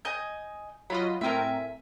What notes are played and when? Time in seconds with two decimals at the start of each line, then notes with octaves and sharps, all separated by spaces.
0.05 D#5 G#5 G6
0.90 F#3 F4 D#5 B5
1.21 A2 C4 A#4 E5 G#5